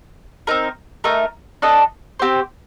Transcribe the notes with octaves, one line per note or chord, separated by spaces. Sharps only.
C4 D#4 A#4
A3 D#4 A#4
D4 A4 D#5
C4 G4 C5